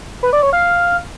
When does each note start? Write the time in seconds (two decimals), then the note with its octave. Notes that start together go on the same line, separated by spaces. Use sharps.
0.23 B4
0.33 D5
0.43 C#5
0.53 F5